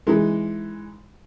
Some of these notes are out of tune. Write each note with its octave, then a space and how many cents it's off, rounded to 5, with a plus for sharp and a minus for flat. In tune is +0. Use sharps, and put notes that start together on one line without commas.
E3 +0 G#3 +0 D#4 +0